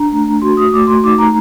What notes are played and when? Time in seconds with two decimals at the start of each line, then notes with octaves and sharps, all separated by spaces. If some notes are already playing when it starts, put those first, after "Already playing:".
Already playing: D4 A#5
0.12 A3
0.42 F#4 C6
0.57 D#6
0.73 A3 D6
0.87 C6
1.04 D#4 D6
1.19 A#5